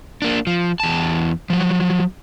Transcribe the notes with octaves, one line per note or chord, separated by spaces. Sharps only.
A#3 D4
F3
E2 A5
F3 F#3